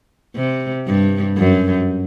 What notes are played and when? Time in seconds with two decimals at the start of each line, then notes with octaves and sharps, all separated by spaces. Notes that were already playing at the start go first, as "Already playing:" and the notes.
0.36 C3
0.87 G2
1.38 F#2